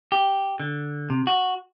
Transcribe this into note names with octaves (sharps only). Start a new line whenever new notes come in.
G4
D3
C3
F#4